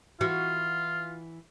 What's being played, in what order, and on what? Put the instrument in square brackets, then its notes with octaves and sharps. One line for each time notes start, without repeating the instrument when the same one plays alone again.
[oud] E3 F#4 [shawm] F4